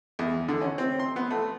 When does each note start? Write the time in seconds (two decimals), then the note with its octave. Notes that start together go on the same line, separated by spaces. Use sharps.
0.19 E2
0.49 D3
0.61 C#4
0.78 C4
0.99 C6
1.16 B3
1.30 A3